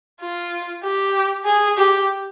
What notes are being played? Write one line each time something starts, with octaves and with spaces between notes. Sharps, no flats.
F4
G4
G#4
G4